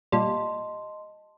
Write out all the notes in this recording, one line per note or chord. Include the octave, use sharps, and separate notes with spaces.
A#2 G3 D#5 A5 C6